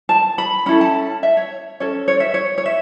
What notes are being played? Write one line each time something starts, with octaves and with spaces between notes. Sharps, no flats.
A5
B5
C#4 E4 A4 B5
A5
E5
C#5
C#4 A4 C#5
C#5
E5
C#5
C#5
E5